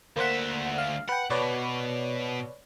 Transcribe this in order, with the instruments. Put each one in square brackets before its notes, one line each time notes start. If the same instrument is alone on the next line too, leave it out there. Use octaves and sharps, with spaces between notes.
[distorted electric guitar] D2 E5 [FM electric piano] A#3 C5 F#5
[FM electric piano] F5
[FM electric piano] B4 G5 [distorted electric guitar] F#5
[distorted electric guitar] B2 [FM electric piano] B4 C#5 D5